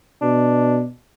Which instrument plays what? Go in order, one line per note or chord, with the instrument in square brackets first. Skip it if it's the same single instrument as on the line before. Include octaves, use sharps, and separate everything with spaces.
[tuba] B2 [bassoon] D4